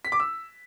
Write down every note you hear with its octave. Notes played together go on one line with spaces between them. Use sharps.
B6
D6
E6